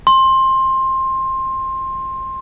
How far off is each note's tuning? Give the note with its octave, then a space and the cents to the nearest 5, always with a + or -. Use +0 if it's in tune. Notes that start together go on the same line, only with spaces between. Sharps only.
C6 +20